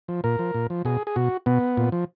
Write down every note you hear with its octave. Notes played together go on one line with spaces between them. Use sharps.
F3
A#2 A#4
F3
A#2
F3
B2 G#4
G#4
B2 F#4
B2 B3
A#2
F3